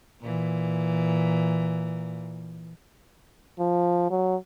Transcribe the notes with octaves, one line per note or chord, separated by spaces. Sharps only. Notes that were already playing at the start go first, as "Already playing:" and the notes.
A#2 E3
F3
F#3